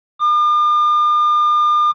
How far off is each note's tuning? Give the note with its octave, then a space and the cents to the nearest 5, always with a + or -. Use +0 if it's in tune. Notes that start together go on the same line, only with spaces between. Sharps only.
D6 +45